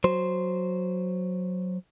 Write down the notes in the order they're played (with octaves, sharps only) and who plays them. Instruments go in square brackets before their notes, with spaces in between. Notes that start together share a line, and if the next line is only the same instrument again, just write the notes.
[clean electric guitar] F#3 C5